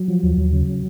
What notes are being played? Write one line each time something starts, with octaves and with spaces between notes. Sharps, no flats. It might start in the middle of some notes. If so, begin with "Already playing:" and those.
Already playing: F#3
F3
D#2
D#2
C#3